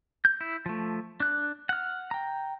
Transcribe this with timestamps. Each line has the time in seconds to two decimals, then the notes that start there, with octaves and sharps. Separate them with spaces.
0.25 G6
0.41 E4
0.66 F3 A3
1.20 D4 F#6
1.69 F#5 F6
2.11 G5 A#5